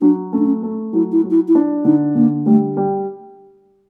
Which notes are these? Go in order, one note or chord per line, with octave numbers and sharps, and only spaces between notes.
F#3 D4
A3 C#4
D4
C#4
A3
F#3 E4
E4
F#3
E4
E4
D4
D3 D#4
D3 A#3
G3 A3
G3